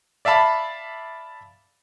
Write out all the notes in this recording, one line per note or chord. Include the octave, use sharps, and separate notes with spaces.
D5 E5 F5 A5 B5